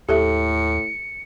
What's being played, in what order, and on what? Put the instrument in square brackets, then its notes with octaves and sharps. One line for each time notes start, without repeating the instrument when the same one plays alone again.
[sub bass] D#2 [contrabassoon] A2 [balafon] G4 A4 E5 [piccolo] C#7